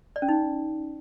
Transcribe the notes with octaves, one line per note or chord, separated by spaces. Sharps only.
D5
C#4
D#4